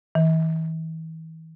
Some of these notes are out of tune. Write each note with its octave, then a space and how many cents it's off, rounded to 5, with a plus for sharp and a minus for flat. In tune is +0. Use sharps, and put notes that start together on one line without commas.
E3 -40